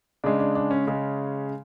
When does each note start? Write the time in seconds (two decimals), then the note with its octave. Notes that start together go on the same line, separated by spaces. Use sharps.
0.24 C#3 G#3 D4
0.39 D4
0.55 D4
0.71 C#4
0.87 C#3 G#3 C#4